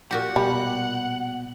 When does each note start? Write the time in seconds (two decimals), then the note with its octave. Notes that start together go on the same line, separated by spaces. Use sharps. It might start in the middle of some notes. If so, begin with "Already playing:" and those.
0.11 A#2 F#4 G4 F#5
0.36 B2 G3